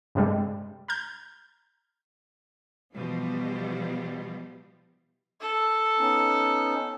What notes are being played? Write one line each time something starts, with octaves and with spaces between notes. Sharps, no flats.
G2 C3 G3 G#3
A#5 F6 G6
B2 E3 F3 G3
A4
B3 C#4 D#4